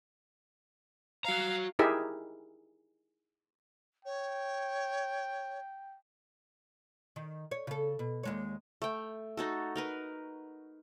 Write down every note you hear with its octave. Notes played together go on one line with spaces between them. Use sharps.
F#4 F5 A#5
D#4 E4 G4 G#4 A#4 E5
C#5 G5
D#3
C#5
C#3 A4
B2
D#2 G#3 C#5
A3 G5
D#4 F#4 A4
D#4 A#4 B4